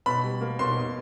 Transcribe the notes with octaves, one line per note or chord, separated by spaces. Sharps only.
B2 B5
G3
A#3
B2 C6
B2